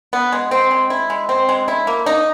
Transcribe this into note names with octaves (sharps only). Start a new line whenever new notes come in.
B3
G#3
C4
G#3
E4
G#3
C4
G#3
E4
A#3
D#4